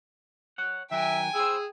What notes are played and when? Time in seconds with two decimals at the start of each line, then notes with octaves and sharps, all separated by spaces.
0.58 C#5 F#5
0.91 D#3 F#3 A#4 E5 G5 G#5
1.35 E4 G#4 C5 E6